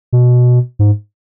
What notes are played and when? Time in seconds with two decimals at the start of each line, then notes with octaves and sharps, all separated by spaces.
0.13 B2
0.79 G#2